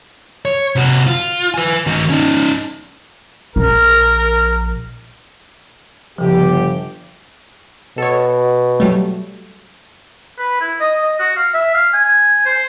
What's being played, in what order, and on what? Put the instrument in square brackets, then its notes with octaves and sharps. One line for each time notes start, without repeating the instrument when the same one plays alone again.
[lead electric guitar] C#5
C3 F#4
F4
B4 G#5
D#3 F#4
C#4 D#4
[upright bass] A#1 [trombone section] A#4
[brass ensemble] G1 G4 [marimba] C#3 F3
[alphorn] B2 [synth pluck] A4 C#5
[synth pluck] F#3 G3 A3
[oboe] B4
E4
D#5
D#5
F#4
F5
E5
F5
G#5
C5